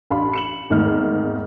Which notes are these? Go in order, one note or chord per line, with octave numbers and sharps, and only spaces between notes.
A1 D4 F5 A5 B5 C6
C#7 E7 F#7
G#1 E2 G#2 D#3 A3 F6